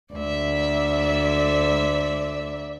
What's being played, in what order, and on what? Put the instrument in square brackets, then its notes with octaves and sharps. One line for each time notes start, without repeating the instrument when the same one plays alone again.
[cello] D2 [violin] D5 E5